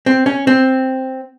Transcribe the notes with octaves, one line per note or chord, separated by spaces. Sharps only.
C4
C#4
C4